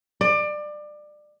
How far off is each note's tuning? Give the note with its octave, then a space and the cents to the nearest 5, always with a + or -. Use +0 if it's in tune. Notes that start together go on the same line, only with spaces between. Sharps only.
D5 +25